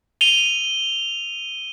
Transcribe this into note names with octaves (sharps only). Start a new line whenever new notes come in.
D#7 F7 G7